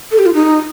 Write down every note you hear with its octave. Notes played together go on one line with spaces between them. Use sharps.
A4
G4
F4
D#4